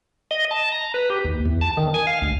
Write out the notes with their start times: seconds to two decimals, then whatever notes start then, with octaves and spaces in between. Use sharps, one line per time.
0.31 D#5
0.51 A5
0.72 A#5
0.94 B4
1.10 G4
1.24 D#2
1.46 E2
1.61 A5
1.77 D#3
1.94 G#5
2.07 F5
2.22 D2